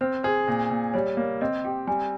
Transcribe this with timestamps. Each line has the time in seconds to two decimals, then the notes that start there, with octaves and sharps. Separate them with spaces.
0.01 C4 C5
0.23 G#4 C5
0.47 A#2
0.70 A#2
0.94 G3 C#5
1.17 A#3 C#5
1.41 C4 D#5
1.65 G4 G5
1.87 G3 G#5